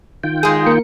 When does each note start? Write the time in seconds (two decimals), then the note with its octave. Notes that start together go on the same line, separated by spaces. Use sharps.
0.24 D#3 F4 G5
0.43 G#3 G#4
0.67 A#3 A#4 C#7